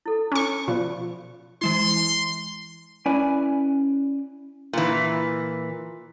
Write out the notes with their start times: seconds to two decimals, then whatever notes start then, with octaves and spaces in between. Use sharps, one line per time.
0.06 E4 A4
0.32 C#4 B5 C#6
0.68 B2 F3 C5 D5 B5
1.62 E3 G#3 E4 C6
3.06 C#4 E4 B4 D5 G#5 B5
4.73 A#2 E3